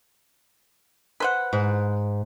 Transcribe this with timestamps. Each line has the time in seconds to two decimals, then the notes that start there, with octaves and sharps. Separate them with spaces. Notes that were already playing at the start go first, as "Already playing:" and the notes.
1.20 B4 C5 F#5
1.53 G#2